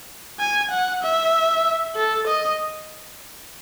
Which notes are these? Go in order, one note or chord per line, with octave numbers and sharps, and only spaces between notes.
G#5
F#5
E5
A4
D#5